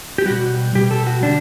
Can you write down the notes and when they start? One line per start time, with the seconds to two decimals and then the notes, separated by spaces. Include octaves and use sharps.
0.18 G4
0.26 B2 G3 F#4
0.75 B2 G3 G4
0.91 A4
1.07 F#4
1.23 D3 G3 D4